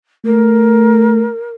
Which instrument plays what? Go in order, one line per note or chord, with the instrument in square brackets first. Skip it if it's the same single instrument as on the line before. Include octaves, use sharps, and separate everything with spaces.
[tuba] A3 [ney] A#4